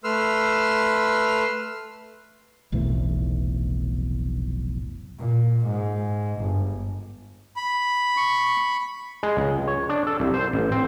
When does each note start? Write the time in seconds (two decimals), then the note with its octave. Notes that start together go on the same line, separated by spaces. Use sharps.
0.04 A3 B4 C6 E6 F6
2.72 F1 B1 A2 E3
5.19 A#2
5.66 G#2
6.41 G1
7.56 B5
8.17 C#6
9.23 G#3
9.37 C#2
9.68 C#5
9.89 D4
10.07 A4
10.20 C2
10.34 C5
10.53 A1
10.72 C4